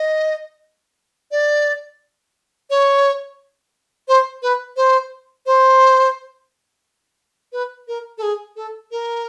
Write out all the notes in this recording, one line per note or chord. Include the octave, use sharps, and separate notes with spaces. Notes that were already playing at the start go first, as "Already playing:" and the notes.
Already playing: D#5
D5
C#5
C5
B4
C5
C5
B4
A#4
A4
G#4
A4
A#4